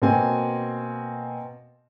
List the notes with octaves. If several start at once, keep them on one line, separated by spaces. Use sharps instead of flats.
B2 A#3 C4 G#5